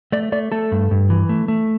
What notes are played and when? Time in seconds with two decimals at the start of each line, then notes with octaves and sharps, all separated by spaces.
0.12 A3 D5
0.32 A3 D5
0.52 A3 A4
0.72 G2
0.91 G2
1.10 E3
1.29 A3
1.48 A3